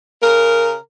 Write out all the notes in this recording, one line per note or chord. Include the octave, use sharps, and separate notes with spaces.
C#3 A#4